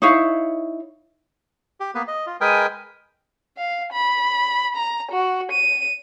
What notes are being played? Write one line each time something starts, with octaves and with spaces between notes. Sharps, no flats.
D#4 E4 C#5 F5
G4
A#3 B3 B4
D#5
F4
G#3 A#4 B4 G5 G#5 D#6
F5
B5
A#5
F#4
D#7